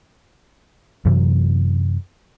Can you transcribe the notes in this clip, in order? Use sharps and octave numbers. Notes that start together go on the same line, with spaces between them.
F#2 C3 E3 F#3